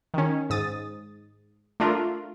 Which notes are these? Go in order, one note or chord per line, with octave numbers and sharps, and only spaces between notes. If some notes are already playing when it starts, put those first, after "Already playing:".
D#3 C#4
G#2 D#6 A6
A3 D4 F4 A#4